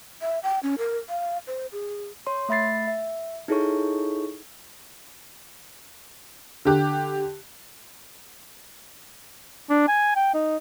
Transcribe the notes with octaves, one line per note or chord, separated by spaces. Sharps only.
E5
G5
C#4
A#4
F5
C5
G#4
C#5 C6
A3 E5 B5 A6 C7
E5
D#4 E4 G#4 A4 C#5 C#6
D3 G4 F#6
D4
G#5
G5
D#4